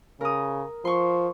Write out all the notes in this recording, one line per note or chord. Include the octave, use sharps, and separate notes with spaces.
C#3 A#4 D#6
F3 C6 C#6